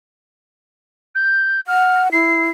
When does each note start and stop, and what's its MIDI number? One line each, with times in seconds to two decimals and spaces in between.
1.15 1.60 91
1.67 2.12 78
1.67 2.01 89
2.12 2.50 64
2.12 2.49 96